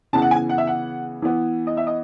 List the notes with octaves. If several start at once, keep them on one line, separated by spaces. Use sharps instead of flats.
C#3 E3 B3 A5
F#5
G#5
F#5
E5
F#5
E3 B3
D#5
E5
D#5